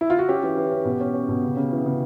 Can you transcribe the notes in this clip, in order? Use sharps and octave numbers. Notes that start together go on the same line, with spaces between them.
E4
F4
F#4
C#4 G4
E3
E3
C#4
B2
C#4
C#4
B2
C#3
C#3
E3
C#3